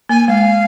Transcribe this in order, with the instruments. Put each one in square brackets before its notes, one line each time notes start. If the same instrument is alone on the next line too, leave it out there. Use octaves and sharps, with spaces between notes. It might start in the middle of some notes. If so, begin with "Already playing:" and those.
[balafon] A#3 [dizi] G#5
[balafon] G#3 [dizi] F5